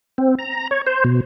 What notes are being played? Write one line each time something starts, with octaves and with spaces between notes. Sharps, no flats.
C4
A#5
C#5
C5
B2